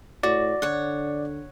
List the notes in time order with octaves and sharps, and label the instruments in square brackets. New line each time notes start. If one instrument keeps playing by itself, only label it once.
[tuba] A2 [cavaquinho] F#4 [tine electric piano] D5
[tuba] D3 [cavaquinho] C#5 F#5